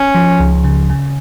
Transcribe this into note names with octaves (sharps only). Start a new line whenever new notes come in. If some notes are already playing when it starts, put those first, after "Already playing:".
Already playing: C#4
F3
C#2
C#3
C#3